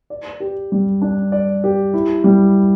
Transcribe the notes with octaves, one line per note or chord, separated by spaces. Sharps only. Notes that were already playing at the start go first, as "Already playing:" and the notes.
D5
G4
G3
D4
D5
G4
E4
G3